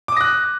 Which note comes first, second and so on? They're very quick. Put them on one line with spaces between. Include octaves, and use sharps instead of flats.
D6 D#6 A#6 F#6